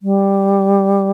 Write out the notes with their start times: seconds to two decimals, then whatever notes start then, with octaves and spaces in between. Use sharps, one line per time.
0.03 G3